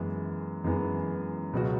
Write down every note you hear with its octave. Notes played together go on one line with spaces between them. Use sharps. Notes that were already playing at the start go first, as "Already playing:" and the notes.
Already playing: F#2 E3 G#3 B3
F#2 E3 G#3 B3
C#2 B2 F#3 B3 F#4